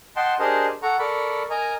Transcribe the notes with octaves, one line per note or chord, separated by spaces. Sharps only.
D#5 F#5 G5 A5 C6
D4 G4 G#4 A#4 C5 D#5
A4 F#5 A#5 C#6
A4 A#4 D5 B5 C#6
A#4 D#5 G#5 A#5